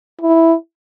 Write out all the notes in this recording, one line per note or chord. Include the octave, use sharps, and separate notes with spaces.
E4